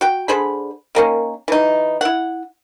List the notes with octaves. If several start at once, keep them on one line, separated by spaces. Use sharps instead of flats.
F#4 G5
D3 G#4 C5 B5
D#3 A#3 C#4
E3 D#4
E4 F#5